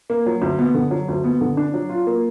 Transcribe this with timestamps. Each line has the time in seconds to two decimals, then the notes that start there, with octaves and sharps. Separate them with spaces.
0.10 A#3
0.26 F#3
0.42 D2
0.59 B3
0.75 D3
0.91 F#3
1.08 D2
1.24 B3
1.41 D3
1.57 D4
1.74 F#3
1.89 F4
2.07 A#3